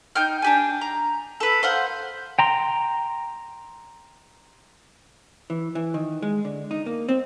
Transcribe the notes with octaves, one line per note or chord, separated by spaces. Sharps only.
D#4 G5 F6
D4 G4 G#5
A#5
A4 B4
C5 F5 F#5
G5 A#5 C6
E3
E3
D#3
G#3
D3
D#4
A#3
C4